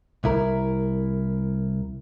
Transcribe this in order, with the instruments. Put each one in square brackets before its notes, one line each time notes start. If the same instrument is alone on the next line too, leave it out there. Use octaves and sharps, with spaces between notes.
[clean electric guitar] C2 E4 A#4